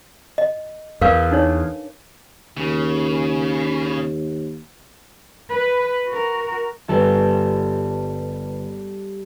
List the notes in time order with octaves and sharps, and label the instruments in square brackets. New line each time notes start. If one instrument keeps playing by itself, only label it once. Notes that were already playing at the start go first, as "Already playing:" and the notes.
[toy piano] D#5
[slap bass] E2 [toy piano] A#4 B4 F5
[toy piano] D4 D#4 C#5
[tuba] D#2 [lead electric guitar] C#3
[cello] B4
F#4 A#4
[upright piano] G1 B4 [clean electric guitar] G3 A4